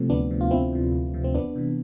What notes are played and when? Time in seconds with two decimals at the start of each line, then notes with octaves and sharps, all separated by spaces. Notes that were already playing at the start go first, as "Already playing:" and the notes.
Already playing: C3 F3 A3 C4
0.09 D2 B3 D4
0.31 C3 F3
0.41 F4
0.51 D2 C4 E4
0.72 C3 F3
0.93 D2
1.14 C3 F3
1.24 C4
1.35 E2 B3 D4
1.56 C3 E3